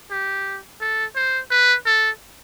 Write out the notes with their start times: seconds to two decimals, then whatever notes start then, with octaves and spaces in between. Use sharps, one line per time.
0.11 G4
0.81 A4
1.16 C5
1.51 B4
1.86 A4